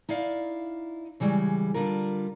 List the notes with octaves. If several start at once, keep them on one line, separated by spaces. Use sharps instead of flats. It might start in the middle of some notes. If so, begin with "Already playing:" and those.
D#4 E4 D5 F5
C#3 E3 G3 G#3
D3 G3 F4 A#4